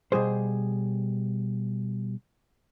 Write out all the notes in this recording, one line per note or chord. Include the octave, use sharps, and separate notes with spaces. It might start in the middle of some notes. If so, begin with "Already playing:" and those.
B2 G3 G#4 C5